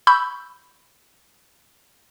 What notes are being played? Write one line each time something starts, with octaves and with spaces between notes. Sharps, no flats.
B5 C#6 E6 G6